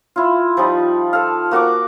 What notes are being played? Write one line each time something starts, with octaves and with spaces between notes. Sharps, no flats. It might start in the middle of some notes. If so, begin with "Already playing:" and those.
E4 F4
F3 G3 D#4
A4 F5
A#3 F#4 F#5 D6